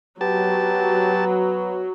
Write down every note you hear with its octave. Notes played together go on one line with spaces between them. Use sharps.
F#3 B3 G4 A5